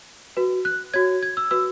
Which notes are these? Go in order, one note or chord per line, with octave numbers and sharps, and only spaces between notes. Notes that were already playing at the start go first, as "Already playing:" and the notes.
F#4 B4
F#6
F#4 C#5 G#6
G#6
E6
F#4 B4 E6